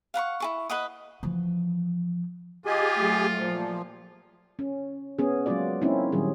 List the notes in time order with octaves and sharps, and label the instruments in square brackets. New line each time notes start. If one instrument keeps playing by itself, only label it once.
[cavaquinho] F5 F#5 B5 C#6
E4 G#4 C#6
B4 D#5 F#5 D#6
[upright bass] E3 F3
[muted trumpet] F4 [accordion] G4 G#4 G#5 [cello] D#5
[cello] F#3 A3
[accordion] A#2 F3
[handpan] C#4
B3 C#4 G#4
F#3 G#3 A#3 F4 F#4 D5
A#3 C4 C#4 D#4 E4
A#2 D#3 F#3 G3 G#4